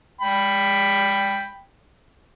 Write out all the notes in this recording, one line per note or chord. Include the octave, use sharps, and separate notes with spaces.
G5 B5